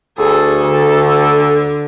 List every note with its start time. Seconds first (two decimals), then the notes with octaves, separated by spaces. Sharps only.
0.19 D2 G#4 A4
0.67 D3